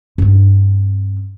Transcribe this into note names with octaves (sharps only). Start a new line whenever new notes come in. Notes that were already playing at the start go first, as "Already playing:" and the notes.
G2 C4